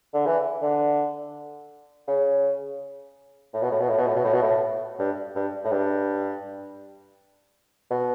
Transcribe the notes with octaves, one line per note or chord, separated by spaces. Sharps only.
D3
E3
D3
C#3
A2
B2
A2
B2
A2
B2
A2
B2
A2
B2
A2
G2
G2
A2
G2
B2